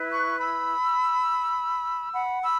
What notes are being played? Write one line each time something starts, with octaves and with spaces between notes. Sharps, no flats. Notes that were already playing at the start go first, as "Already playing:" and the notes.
Already playing: E4 B4
C#6 F#6
B5 E6
F#5 B5
B5 E6